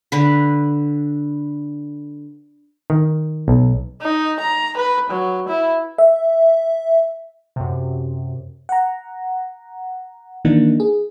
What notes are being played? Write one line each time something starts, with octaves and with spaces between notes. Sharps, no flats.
D3 B4
D#3
B1
D#4
A#5
B4
F#3
E4
E5
F#2 C3
F#5 A#5
D#3 E3 A#3 D4 D#4
G#4